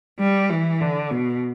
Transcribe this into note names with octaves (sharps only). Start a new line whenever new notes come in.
G3
E3
D3
B2